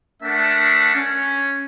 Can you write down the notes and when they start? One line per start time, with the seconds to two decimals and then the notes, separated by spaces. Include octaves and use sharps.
0.23 A3 D4 A#4 E5 F#5 A5
0.95 C#4